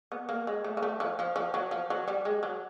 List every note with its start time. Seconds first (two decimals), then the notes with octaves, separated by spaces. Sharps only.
0.12 B3
0.29 A#3
0.47 G#3
0.64 A3
0.77 A#3
0.82 A3
1.00 F3
1.19 F3
1.36 F3
1.54 F#3
1.71 F3
1.90 F#3
2.08 G3
2.25 G#3
2.43 F#3